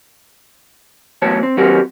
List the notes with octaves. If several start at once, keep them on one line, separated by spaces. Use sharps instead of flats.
E2 A2 F#3 C#5 A5
C4
D#3 F#3 C4 F#4 G4 A#4